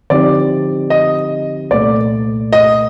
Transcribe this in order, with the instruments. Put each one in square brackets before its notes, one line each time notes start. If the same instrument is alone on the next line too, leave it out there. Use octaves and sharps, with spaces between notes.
[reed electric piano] D3 F3 C4 D#4 G4 [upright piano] D5
[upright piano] D#5
[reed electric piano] C2 A#2 A3 [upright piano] D5
[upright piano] D#5